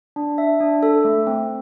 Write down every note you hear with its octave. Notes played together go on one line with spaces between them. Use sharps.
D4
E5
D4
A4
A3
C4